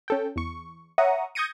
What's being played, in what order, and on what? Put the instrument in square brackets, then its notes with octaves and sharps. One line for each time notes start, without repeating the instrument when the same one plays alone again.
[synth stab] C#4 A4 G5
E2 C#6
C#5 E5 F#5 A#5 C#6 D#6
D#6 G6 G#6 A#6 C#7 D#7